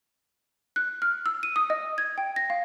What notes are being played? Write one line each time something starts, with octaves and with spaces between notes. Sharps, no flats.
F#6
F6
E6
D#7
D#6
D#5
G#6
G5
A#6
F5